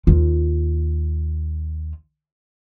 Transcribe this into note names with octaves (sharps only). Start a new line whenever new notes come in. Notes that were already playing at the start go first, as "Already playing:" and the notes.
D#2 F4